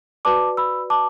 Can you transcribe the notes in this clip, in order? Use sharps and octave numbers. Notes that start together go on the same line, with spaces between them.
F#4 B4 D5 A5 D6
B5 E6
A5 D6